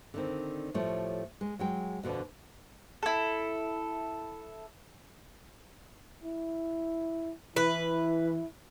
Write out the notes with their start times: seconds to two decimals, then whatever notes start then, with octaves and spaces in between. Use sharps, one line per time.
0.14 D3 D#3 C4
0.74 A2 F3 G3 A3 C#5
1.41 G#3
1.59 F#3 G#3 G5
2.03 F2 B2 D3 B3 D4
3.03 E4 A4
6.24 E4
7.56 E3 E4 B4